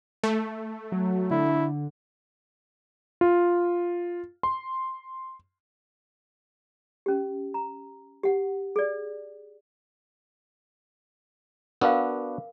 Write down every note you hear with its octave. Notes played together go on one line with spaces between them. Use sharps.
A3
F#3
D3 E4
F4
C6
C#4 G4
A#5
G4 F#5
G#4 D5
B3 D4 F#4 A#4 B4 F5